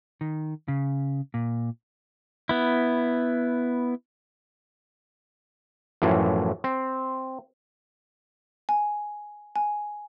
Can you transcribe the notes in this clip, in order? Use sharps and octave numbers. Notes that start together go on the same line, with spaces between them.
D#3
C#3
A#2
B3 E4
F#2 A2 E3 F3
C4
G#5
G#5